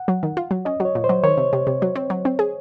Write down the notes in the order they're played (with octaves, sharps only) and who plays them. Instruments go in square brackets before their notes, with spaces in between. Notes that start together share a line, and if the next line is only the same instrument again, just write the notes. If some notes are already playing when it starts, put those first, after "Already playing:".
Already playing: [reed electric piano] F#5
[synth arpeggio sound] F#3
D#3
F4
F#3
[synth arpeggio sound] C#4 [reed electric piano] D#5
[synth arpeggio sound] F#3
[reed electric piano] C#5
[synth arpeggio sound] A#2
[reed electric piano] C5
[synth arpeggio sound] F#3
[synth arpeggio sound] D#3 [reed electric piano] C#5
[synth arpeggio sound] C3
C3
C3
F#3
C4
F#3
C4
G#4